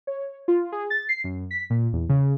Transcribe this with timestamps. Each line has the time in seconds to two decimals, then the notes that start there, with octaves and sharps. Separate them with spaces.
0.07 C#5
0.48 F4
0.72 G#4
0.90 A6
1.09 C7
1.24 F#2
1.51 B6
1.70 A#2
1.93 E2
2.09 C#3